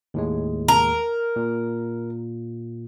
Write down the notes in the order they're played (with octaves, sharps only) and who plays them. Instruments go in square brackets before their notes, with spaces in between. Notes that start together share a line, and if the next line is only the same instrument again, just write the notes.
[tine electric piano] D#2 A2 G#3
[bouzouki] A#4
[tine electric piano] A#2